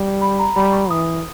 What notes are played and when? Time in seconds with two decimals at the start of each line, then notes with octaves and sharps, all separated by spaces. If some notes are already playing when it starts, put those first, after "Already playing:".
Already playing: G3
0.21 B5
0.39 A#5
0.56 G3 B5
0.73 C#6
0.90 E3 D#6